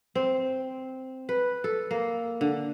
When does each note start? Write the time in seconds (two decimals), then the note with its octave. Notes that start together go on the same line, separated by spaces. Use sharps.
0.15 C4
1.29 B4
1.64 A4
1.91 A#3
2.41 D3